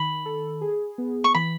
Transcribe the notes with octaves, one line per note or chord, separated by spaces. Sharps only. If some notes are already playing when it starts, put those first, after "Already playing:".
Already playing: D#3 B5
A4
G#4
B3
C#6
E3 B5